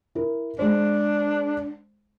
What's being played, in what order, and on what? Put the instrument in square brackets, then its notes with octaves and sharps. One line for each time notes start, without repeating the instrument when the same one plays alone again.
[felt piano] E4 A#4
[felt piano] G#3 C5 [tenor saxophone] D4